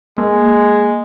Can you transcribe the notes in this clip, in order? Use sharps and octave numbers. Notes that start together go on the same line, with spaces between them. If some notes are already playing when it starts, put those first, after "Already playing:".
G#3 A#3